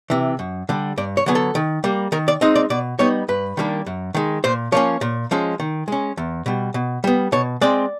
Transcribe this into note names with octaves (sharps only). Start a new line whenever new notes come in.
C3 E3
F#2
D3 G3
G2 D5
C#5
D3 F#3 B3 G#4
A4
D#3
G3 A#3
D#3 A#4
D5
G#3 C4 D#4 D#5
D5
B2 D5
G3 B3 D#4 C#5
G2 B4
D#3 G3 A#3 D4
F#2
D#3 G#3
A#2 C5
F3 A#3 C#4 C#5
A#2
F3 G#3 C#4
D#3
G#3 C#4
E2
B2 G3
B2
G3 B3
B2 C#5
G#3 C4 D5